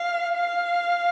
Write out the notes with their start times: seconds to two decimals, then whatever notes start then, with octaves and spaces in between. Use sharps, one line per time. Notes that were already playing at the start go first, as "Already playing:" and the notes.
Already playing: F5
0.36 F5